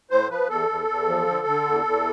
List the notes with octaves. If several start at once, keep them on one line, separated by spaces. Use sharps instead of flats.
A2 C5
F3 B4
E2 A4
E2
E2
F3
D3
D3
E2
E2